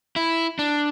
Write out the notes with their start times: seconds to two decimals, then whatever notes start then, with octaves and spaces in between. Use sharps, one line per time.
0.16 E4
0.59 D4